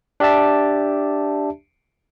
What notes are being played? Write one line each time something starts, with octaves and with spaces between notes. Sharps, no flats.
D4 G4 D5 E5 A5